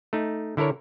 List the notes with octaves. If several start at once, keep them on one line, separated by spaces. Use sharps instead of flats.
A3 D#4
D3 E4 A4 A#4 C#5